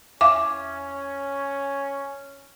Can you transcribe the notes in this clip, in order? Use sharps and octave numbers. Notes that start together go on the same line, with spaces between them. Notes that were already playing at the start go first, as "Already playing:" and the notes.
E2 C#4 E5 F5 D6